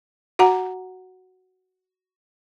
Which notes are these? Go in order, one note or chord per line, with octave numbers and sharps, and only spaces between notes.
F#4 F#5 A#5